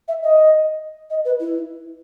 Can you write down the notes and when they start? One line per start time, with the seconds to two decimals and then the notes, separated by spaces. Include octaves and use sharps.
0.08 E5
0.23 D#5
1.10 D#5
1.25 B4
1.40 E4